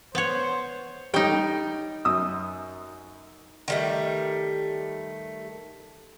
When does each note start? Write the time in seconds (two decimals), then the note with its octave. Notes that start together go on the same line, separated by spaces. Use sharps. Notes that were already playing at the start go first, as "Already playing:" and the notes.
0.15 B3 C5 C#5
1.14 G3 D#4 C#5 G5
2.05 F#2 D#6 E6
3.68 D#3 G3 A3